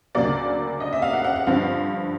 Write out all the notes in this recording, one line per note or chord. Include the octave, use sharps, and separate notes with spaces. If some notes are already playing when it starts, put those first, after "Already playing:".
D2 C#3 F#3 A#3 D5
D#5
E5
F5
F#5
F#5
F#5
G2 D3 F3 F5